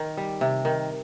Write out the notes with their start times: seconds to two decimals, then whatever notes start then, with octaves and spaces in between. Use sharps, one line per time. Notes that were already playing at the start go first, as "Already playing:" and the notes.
Already playing: D#3
0.17 G3
0.41 C3
0.65 D#3